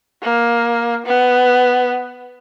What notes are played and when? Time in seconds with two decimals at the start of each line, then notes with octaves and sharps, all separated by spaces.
0.23 A#3
1.06 B3